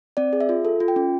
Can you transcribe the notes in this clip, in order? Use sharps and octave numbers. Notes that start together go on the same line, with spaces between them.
C4 D5
G#4
E5
F4
A4
F4
G5
C#4